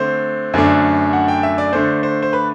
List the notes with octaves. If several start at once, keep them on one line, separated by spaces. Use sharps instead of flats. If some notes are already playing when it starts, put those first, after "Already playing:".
Already playing: D3 A3 C4 C5
F#2 D3 A3 D4
F#5
G5
E5
D5
D3 A3 D4 C5
C5
C5
B4